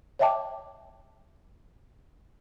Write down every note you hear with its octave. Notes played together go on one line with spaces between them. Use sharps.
C#5 D#5 E5 G5 A5 D6